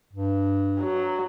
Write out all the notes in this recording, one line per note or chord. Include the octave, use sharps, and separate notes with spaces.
G2
F#3